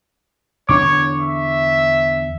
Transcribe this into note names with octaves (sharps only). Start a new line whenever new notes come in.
E2 D3 D4 C#5 C#6 D6
E5